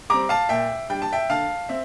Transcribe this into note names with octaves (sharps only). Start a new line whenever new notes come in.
G3 C4 A#5 D6
F5 A5
A#2 E5 G5
G3 D4 G5
A5
E5 G5
D3 F5 A5
C4 E5